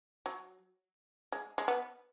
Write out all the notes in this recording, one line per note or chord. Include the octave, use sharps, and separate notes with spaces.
F#3
G#3
G#3
B3